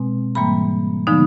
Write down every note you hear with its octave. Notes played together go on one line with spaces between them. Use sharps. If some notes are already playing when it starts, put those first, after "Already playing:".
Already playing: B2 G#3 C4
G#2 E3 G3 A#3 B5
D3 F3 G#3 B3 D#4